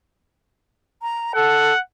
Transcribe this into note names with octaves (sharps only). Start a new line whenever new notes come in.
A#5
A4 F#5